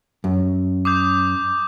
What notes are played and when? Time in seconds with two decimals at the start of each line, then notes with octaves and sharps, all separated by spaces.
0.24 F#2
0.85 D6 D#6 G6